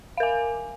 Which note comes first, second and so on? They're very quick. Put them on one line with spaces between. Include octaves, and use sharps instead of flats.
F5 A#4 G#5